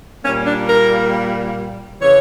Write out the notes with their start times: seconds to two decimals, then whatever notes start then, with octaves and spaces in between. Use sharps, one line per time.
0.24 A#2 G3 A#3 C#4
0.46 D4
0.68 A#4
2.01 C#3 E3 C#5